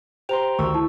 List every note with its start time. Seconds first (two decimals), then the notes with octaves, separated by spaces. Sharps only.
0.29 G4 C5 G5 A#5 C6 F7
0.59 D2 D#3 A3 C#6 E6
0.74 E4 A5